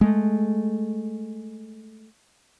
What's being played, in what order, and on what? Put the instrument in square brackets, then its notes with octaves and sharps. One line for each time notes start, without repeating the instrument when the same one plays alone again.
[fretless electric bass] G#3 A3